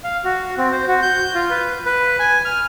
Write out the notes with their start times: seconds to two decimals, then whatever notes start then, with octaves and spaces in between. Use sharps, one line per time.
0.04 F5
0.24 F#4
0.58 C4
0.72 C5
0.88 F#4
1.02 G6
1.35 F4
1.50 B4
1.86 B4
2.19 G#5
2.45 F6